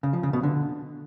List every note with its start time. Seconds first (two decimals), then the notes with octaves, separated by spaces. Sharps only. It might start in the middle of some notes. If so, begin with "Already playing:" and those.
0.03 C#3
0.13 F3
0.23 C#3
0.33 B2
0.43 D3